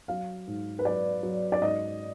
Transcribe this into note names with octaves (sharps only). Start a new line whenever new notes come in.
F#3 F5
G#2
B4
F#3 D5
F#3
D5
G#2 D#5